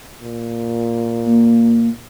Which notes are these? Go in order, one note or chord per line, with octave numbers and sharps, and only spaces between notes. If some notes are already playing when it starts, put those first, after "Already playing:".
A#2
A#3